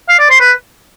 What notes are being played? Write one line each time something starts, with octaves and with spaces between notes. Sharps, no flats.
F5
D5
C5
B4